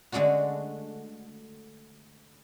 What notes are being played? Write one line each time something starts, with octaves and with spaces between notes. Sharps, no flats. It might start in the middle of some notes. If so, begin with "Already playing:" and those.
D3 G#3 A3 D4 F#4